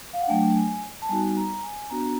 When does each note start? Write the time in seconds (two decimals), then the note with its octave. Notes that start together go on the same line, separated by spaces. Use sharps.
0.13 F5
0.21 F#5
0.28 F#3 A3 D4 G5
0.55 G#5
1.02 A5
1.09 G3 B3 D#4 F#4 G#5
1.37 A#5
1.63 G#5
1.90 B3 D4 F#4 A#5